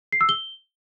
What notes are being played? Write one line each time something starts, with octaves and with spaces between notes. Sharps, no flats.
C7
E6
G7